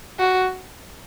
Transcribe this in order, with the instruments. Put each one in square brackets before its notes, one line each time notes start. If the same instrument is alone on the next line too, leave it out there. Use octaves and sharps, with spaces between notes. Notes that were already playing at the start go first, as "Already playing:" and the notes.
[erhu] F#4